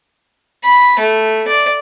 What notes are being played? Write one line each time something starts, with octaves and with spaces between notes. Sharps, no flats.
B5
A3
D5